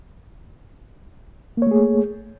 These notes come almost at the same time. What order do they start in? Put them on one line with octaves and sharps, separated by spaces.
A#3 C#5 A3 G#4